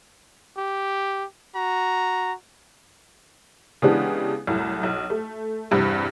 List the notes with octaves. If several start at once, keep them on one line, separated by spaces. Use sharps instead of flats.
G4
F#4 A#5
C#3 E3 G#3 B3 D4 G4
C2 F#2 A2
B1
A3
E2 G2 C3